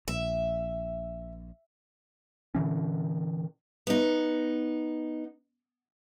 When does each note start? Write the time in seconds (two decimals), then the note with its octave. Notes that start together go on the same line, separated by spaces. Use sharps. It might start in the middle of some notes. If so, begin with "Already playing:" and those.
0.08 A#1 E5
2.55 A#2 D3 E3 C#4
3.87 B3 D#4